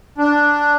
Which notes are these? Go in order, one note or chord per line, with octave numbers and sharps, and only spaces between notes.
D4